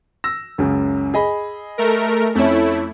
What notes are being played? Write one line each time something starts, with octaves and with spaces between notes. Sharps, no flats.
E6 A#6
C#2 F#2 C#3
G#4 D#5 B5
A3 A#4
F2 A3 C#4 E4